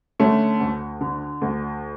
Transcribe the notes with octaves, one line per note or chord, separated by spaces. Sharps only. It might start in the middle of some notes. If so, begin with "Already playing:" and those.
D3 A3 C#4
D2
D3
D2